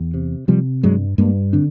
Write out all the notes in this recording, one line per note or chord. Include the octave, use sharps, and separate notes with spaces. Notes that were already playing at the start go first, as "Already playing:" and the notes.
Already playing: E2
C3
C3 F3 G3
G2 F#3 G#3
G2 G#3 A#3
D3 C4 D4